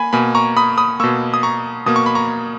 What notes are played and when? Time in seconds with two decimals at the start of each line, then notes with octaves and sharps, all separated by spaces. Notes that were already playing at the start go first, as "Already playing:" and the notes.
Already playing: A#3 G#5 B5
0.13 B2 A#3 G#5 B5
0.35 A#5 C#6
0.57 B5 D#6
0.78 B5 D#6
1.00 B2 A#3 C#6 E6
1.34 D#6
1.43 A#5 C#6
1.86 B2 A#3 D#6
1.96 C#6
2.06 B5
2.15 A#5 C#6